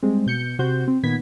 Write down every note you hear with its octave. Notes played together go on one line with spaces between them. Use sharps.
G3 G#3 C4
B2 G6 C#7
C3 F#4 C5 G6
C4
A#2 D#3 B3 G#6 B6